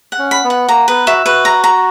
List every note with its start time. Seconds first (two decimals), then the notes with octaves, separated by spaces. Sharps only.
0.12 F#5
0.19 C#4
0.31 B5
0.44 B3
0.50 F#5
0.69 A#3 A#5
0.88 B3 B4
1.07 F#4 E5
1.26 F#4 B4
1.45 A#5
1.64 A#5